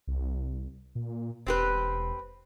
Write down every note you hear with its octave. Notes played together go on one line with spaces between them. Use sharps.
C2
A#2
E1 C4 G4 B4